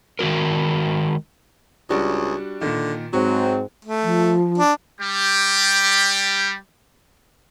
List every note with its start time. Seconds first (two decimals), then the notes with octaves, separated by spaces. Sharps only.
0.19 D#3 G#3 F#4 A#4
1.90 C#2 G3 D4 F#4
2.61 A#2 D3 D#3
3.13 G#2 F#3 C4 F#4
3.85 A3
4.03 F3
4.58 D4
5.00 G3 G4